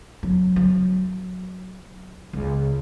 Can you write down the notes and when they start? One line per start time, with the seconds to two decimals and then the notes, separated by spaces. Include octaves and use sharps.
0.23 F#3
0.56 F#3
2.33 C#2